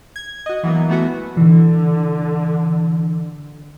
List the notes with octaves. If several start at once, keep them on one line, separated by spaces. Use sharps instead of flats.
G#6
F#4 D#5
E3 F#3 A#3 B3
E3 A3 B3 F#4
D3 E3